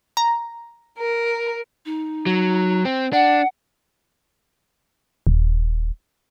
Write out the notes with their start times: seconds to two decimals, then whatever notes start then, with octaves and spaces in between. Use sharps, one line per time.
0.17 A#5
0.97 A#4
1.85 D#4
2.26 F#3
2.85 C4
3.13 D4 F#5
5.27 D#1